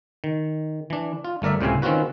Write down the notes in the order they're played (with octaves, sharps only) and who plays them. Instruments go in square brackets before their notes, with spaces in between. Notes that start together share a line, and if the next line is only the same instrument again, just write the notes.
[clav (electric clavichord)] D#3
E3 D4
F4
G1 A3 A#4 D5 E5
C#2 A2 C3 C4 F5 G#5
D#3 C4 C#4 F4 F#4 B4